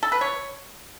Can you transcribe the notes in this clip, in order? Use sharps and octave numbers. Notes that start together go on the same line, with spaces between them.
A4
B4
C#5